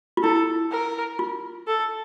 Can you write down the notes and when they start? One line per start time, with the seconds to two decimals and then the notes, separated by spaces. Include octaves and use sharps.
0.17 F4
0.23 E4 A4
0.71 A#4
1.19 F4
1.67 A4